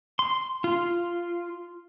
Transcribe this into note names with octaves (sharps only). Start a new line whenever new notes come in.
C6
F4